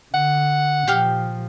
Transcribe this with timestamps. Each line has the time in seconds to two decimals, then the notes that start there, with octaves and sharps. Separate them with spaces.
0.14 D3 F#5
0.87 A#2 F3 G4 F5